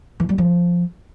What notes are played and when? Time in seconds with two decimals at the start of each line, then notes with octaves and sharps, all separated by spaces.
0.20 E3
0.29 G3
0.38 F3